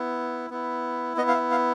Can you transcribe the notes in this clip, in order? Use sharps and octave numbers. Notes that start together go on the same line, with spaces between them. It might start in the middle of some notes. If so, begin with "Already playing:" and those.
Already playing: B3 E4
B3 E4
B3 D#5
E4
F5
E5
F5